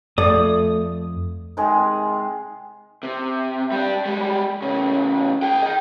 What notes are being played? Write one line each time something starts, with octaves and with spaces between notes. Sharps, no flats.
F2 A3 D5 D#6
C3 D#3 G#3 G#4
C3
G3 D4
G3 G#3
A2 C#3
G#4 G5
D#5 G5